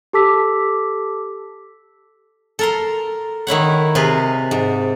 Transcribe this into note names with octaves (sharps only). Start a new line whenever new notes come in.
G4 A4 A5 D6 E6 B6
A4 A#4 C6
D#3 E4 C#5 F#5
C3 F4 G#4 B4
G#2